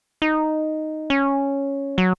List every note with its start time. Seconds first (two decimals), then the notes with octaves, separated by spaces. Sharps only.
0.22 D#4
1.10 C#4
1.98 F#3